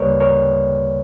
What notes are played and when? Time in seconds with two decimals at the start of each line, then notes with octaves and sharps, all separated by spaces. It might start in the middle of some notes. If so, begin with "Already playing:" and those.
Already playing: D2 C#3 G3 A#3 A#4 B4 C#5 D5
0.20 A#4 C#5